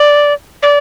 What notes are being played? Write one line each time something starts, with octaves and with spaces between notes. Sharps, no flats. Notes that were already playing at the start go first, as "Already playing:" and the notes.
Already playing: D5
D5